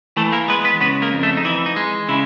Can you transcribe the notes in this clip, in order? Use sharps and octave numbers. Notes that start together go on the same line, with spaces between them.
E3 A3 A4
A#3 A#4
G#3 B3 B4
B3 B4
C#3 B3 B4
A#3 A#4
F2
A3 A4
D#4
E3 E4
D#4
G#3
C#3 E4